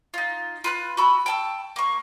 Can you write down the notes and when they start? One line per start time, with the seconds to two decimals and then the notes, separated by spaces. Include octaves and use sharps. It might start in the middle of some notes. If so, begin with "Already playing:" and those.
0.14 D#4 F4
0.64 F4 B4 F#6
0.97 F#4 B5 E6
1.26 G5 A5 E6
1.76 A#3 C#6